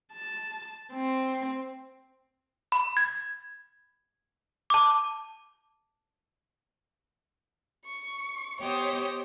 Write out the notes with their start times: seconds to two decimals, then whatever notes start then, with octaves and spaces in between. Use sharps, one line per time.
0.13 A5
0.92 C4
2.72 B5
2.97 G#6
4.70 A5 D6
7.84 C#6
8.58 B3 G4 C5 C#5 D#5